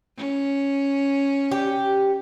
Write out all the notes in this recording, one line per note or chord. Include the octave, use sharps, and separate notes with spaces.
C#4
G4